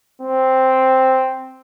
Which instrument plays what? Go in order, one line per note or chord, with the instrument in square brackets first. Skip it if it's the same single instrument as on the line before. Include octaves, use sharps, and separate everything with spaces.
[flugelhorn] C4